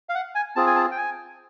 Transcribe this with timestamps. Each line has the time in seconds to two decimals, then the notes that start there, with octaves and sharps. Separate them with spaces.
0.09 F5
0.15 F#5
0.35 G#5
0.56 C4 F4 G#4 A5
0.67 G#5
0.76 A5
0.91 G5
0.98 G#5